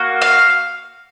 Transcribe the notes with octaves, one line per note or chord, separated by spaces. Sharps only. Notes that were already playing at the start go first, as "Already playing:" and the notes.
Already playing: A#3 F#4
F5